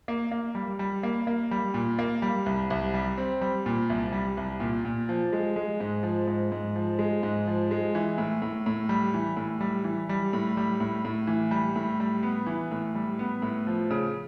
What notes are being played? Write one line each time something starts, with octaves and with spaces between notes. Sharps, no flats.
A#3
A#3
G3
G3
A#3
A#3
G3
A#2
A#3
G3
C2
C2
G3
C4
G3
A#2
C2
G3
C2
A#2
A#2
F3
G#3
G#3
G#2
F3
G#2
G#2
F3
G#3
G#2
F3
G#3
E3
A2
A2
A2
G3
E3
A2
G3
E3
G3
A2
G3
A2
A2
E3
G3
A2
G3
B3
E3
A2
G3
B3
A2
F3
C#3